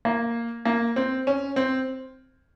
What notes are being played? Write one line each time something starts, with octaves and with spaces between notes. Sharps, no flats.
A#3
A#3
C4
C#4
C4